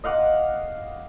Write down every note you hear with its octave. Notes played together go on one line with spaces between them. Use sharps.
D#5 F5 F#5 D6